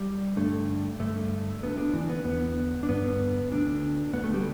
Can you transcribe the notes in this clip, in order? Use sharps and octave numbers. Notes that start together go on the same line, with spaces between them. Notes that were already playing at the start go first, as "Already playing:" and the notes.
Already playing: G3
G2 D3 A3
G2 D3 A3
D2 D3 B3
D4
E3
B3
E2 D3 B3
D4
G2 D3 B3
D2 D3 D4
D2 D3 B3
A3
G3